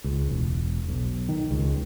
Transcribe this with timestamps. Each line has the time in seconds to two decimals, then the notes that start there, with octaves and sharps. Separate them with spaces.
0.04 C#2
0.28 E1
0.88 B1
1.29 D#3
1.51 C#2